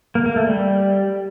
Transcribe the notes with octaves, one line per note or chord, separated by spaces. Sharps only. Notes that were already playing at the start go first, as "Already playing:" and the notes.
A#3
A#3
A3
G3